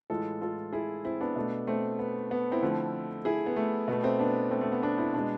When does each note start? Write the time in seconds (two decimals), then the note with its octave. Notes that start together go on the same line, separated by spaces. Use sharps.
0.10 A2 E3 G#3 F4 A4
0.41 F4 A4
0.73 E4 G#4
1.05 C4 E4
1.21 B3 D4
1.36 B2 A3
1.67 A3 C4
1.99 B3
2.31 B3
2.52 C4 E4
2.62 D3 F3 A3
3.25 E4 G#4
3.46 B3
3.56 A3
3.88 B2 A3 B3
4.04 A3 C4
4.19 B3 D4
4.51 A3 C4
4.61 A3
4.72 B3
4.82 B3 D4
4.98 C4 E4
5.14 B2 G#3 B3 D4